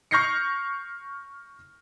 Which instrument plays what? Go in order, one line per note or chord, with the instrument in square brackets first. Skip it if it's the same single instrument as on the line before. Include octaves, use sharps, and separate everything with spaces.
[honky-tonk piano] C#6 F6 G6 A#6 C7 C#7